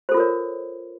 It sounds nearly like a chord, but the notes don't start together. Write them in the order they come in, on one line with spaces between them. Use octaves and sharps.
C5 A4 F4 A#4 C#5